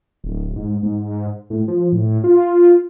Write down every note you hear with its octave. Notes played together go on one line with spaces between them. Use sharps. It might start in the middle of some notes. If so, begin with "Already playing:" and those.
D1
G#2
G#2
A2
F3
A2
F4